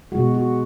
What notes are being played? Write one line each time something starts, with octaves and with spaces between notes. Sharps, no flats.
B2 G#3 F#4
F#4